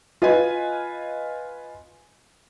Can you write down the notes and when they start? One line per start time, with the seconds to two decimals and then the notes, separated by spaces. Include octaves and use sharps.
0.22 F4 B4 D#5 F5 G#5